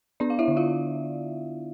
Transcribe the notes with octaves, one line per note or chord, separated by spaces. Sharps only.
B3 D4 D5
F5
E4 E5
D3
F4 F5